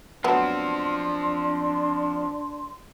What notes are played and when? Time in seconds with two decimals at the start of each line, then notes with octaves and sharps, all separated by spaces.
0.24 F3 F#3 A3 B3 C4 D4 C6